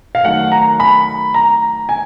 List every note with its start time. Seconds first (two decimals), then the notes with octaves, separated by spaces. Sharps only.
0.15 F5
0.25 D#3 F#3 A3 F#5
0.52 A#5
0.80 B5
1.34 A#5
1.89 G#5